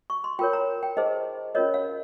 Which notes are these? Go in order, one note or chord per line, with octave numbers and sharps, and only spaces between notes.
C#6
C6
F4 A#4 C#5 G5
A#5
G5
D#4 G#4 C5 D#5
C#4 F4 A#4 C#5 D#5
F5